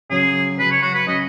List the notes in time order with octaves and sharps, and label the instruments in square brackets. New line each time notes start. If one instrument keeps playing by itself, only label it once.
[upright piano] C#3 F#3 C#4 [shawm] G#4
[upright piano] C#3 F#3 C#4 [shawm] B4
[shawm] C#5
F#4
B4
[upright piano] C#3 F#3 C#4 [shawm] D#5